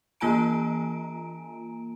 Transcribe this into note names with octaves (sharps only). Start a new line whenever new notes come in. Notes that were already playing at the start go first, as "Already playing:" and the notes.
E3 A#3 F4 G#5 A#5 D7